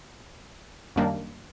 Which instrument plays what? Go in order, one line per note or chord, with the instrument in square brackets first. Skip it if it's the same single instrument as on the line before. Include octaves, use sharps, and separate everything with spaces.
[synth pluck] F#2 D#3 G3 A#3 D4